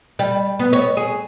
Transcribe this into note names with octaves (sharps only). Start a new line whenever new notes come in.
G3
B3
C#5
G#4